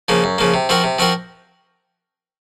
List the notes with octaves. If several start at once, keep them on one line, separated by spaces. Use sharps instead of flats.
C#3 F3 A#3
F#2
C#3 F3 A#3
C3
F3 C4 F#4 A#4
C3
F3 C4 F#4 A#4